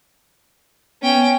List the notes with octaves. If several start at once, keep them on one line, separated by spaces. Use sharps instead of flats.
B3 C#4 G5